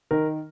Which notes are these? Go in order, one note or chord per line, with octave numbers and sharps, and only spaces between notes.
D#3 A#4